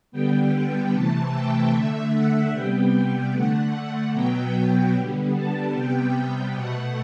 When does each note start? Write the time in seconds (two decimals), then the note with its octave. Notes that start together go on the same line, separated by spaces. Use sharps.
0.12 D3 G3 B3 G5
0.92 C3 E3 A3 A5
1.32 G5
1.73 D3 A3 E5
2.13 F#5
2.52 C3 G3 B3 G5
2.94 G5
3.33 D3 A3 F#5
3.73 F#5
4.13 B2 F#3 B3 G5
4.94 D3 G3 B3
5.34 A5
5.74 C3 G3 B3 G5
6.15 G5
6.54 B2 A3 F#5